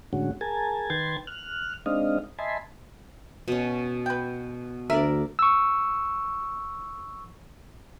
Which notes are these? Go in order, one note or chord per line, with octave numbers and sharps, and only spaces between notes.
A2 D3 G#3 C#4 F#4
G#4 A#4 G#5 A5
D#3 B4 G5 C6 G#6 A6
F6 F#6
G#3 C4 D4 D#4 D#5 F5
D#5 E5 G#5 A5 B5 C6
B2 C#4
B4 G5
D2 A#4 D5 E5
C#6 E6